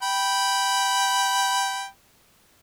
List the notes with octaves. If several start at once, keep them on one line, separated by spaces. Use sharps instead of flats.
G5 B5